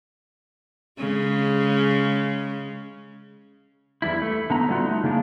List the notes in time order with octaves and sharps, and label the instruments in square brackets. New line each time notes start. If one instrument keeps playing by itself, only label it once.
[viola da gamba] C#3 G#3
[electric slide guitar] E2 G3 E4
A3
D3 B3 A#5
F#3 G3 A3 B3 F4 F#4
A3 D#4
C#3 G#3 A#3 D4